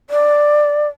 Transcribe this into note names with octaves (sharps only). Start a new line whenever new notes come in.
D5